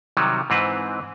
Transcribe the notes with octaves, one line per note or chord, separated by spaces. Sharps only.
C3 D#3 F#3 G3
G#2 E3 C4 B4